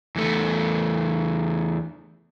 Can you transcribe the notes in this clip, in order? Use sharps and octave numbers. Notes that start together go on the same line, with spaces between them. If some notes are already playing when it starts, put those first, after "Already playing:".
E2 A3